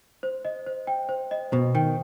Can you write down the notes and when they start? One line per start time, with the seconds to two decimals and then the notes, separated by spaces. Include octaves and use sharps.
0.23 C5
0.45 D#5
0.66 C5
0.87 G5
1.09 C5
1.31 D#5
1.52 B2 C5
1.75 D#3 G5